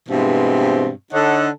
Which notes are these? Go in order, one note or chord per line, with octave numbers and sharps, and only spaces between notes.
G2 B2 E3 G#3 C4
D3 D4 D#4 A4 C#5 F#5